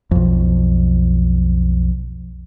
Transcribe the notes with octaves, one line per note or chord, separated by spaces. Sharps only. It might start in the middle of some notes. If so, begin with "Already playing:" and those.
B1 F2